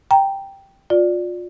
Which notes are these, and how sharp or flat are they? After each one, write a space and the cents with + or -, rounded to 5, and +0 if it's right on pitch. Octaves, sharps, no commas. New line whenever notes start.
G5 +0 A#5 +0
F4 +30 D5 +0